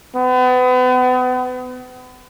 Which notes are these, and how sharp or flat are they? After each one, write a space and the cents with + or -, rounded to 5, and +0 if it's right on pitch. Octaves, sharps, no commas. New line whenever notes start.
B3 +35